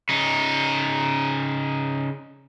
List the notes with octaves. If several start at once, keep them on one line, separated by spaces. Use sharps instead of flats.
C#3 D#4